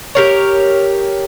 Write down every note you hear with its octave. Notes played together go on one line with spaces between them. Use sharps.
G4 A#4 C#5